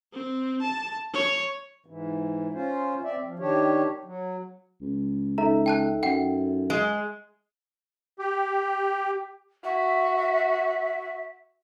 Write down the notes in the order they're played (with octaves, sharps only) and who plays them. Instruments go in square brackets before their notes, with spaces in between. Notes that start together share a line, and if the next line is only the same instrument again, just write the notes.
[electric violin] C4
A5
C#5
[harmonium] G#2 E3
C#4 F4 C5
C4 D5 E5
F3
D#3 D4 G4 C#5
F#3
[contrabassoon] C#2
[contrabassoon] C#2 [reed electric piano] D#4 A4 E5 [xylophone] A#5
[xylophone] G5 A5 F#6
[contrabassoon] F#2 [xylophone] F#5 G5
[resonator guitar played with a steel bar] G#3
[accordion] G4
[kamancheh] F#4 [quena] E5